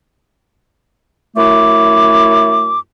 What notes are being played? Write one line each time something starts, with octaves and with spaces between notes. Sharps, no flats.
F#2 A3 E4 D6